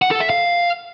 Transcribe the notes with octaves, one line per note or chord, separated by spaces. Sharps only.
F#5
A4
E5
F5